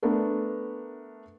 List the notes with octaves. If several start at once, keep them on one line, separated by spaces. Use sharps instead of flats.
A3 B3 D4 A#4 B4